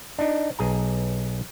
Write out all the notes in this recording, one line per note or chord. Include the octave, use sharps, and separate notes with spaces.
D4 D#4
B1 G#4 A#5